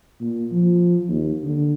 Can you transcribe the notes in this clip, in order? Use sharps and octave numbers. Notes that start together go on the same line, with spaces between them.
A#2
F3
D#2
D3